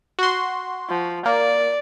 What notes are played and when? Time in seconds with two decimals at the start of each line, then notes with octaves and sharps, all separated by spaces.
0.19 F#4 C6
0.89 F3
1.25 A#3 D5